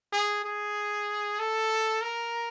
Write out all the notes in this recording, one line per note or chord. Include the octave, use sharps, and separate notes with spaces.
G#4
G#4
A4
A#4